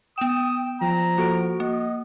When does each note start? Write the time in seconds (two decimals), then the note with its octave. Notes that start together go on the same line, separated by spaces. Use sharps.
0.18 B3 G5 D#6 E7
0.82 F3 A#5
1.18 A#3 F#4 A4 D7
1.60 A#3 D#5